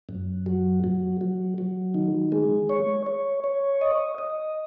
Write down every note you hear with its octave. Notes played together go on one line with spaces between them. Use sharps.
F#2
F#3
F#3
F#3
F#3
D#3
G#3
C#5
C#5
C#5
D#5
D#5